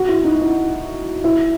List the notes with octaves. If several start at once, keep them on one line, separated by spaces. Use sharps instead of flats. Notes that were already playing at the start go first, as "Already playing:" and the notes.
Already playing: F#4
E4
D#4
E4
E4